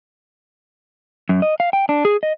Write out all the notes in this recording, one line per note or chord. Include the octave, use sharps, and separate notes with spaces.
F#2
D#5
F5
G5
D4
G#4
D#5